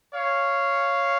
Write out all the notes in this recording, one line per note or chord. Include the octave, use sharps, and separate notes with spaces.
C#5 F5